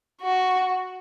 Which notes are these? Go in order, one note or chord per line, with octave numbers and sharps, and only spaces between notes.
F#4